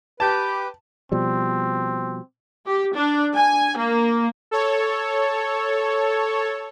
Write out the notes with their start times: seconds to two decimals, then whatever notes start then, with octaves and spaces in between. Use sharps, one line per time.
0.20 G4 B4 A5
1.12 B2 F3 G3 C4
2.66 G4
2.95 D4
3.36 G#5
3.78 A#3
4.51 A4 C#5